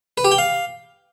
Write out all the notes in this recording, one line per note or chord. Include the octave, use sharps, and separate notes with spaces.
B4
G4
G5
F5